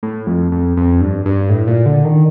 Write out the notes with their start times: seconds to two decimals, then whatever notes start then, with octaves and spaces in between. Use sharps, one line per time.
0.03 A2
0.27 F2
0.52 F2
0.77 F2
1.01 G2
1.25 G2
1.50 A2
1.68 A#2
1.86 D3
2.05 D#3